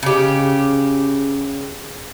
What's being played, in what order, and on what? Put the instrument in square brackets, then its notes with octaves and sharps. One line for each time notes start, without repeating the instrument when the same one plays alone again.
[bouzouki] C#3 G4